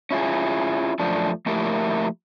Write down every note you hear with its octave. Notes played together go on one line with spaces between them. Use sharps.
C#4 E4 F4 G#4
F#2 F3 A3 D4
F3 A3 A#3 E4 G4 A#4